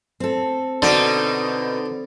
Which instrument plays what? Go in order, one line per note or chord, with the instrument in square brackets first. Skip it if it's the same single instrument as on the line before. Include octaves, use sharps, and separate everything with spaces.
[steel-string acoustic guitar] C4 A4
[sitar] B2 D#4 [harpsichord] D3